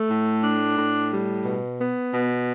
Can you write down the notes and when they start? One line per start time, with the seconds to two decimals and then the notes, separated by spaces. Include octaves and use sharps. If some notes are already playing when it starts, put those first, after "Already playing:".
Already playing: A3
0.09 A2
0.43 D4
0.77 A2
1.11 G3
1.44 B2
1.79 B3
2.12 B2